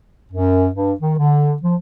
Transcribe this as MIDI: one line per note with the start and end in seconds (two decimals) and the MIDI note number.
0.32 0.66 42
0.73 0.93 43
1.00 1.14 51
1.18 1.54 50
1.62 1.75 53